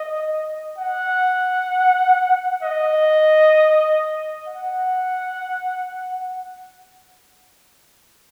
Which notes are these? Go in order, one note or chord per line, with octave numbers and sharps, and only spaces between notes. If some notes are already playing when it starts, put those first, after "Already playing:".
Already playing: D#5
F#5
D#5
F#5